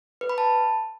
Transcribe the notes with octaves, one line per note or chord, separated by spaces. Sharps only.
B4
B5
A5